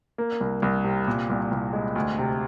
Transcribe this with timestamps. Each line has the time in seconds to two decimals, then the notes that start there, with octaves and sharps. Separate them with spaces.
0.18 A#3
0.41 C2
0.62 C2
0.84 C3
1.07 A#2
1.30 C2
1.51 C2
1.73 G#3
1.96 D2
2.18 C3